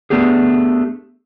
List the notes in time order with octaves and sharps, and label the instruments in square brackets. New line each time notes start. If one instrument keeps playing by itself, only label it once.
[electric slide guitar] A3 B3 D4 G4 G#4